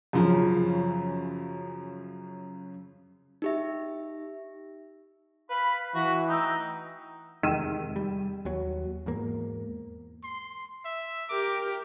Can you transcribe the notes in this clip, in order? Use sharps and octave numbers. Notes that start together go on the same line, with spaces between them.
F#2 C#3 F3
D#4 G4 E5
B4 F5 B5
E3 F#4 B4
A3 D#4 G5 E6
E2 C3 D#3 G#3 E6 D#7
G3
D#2 F#3
E2 G#2 A#3
C6
E5
G4 A#4 D6